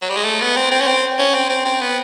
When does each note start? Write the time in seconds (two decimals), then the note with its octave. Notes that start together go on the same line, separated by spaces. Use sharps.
0.02 F#3
0.10 G3
0.17 G#3
0.24 A3
0.41 B3
0.57 C4
0.72 C4
0.81 C#4
0.87 C4
1.18 C#4
1.34 C4
1.49 C4
1.65 C4
1.81 B3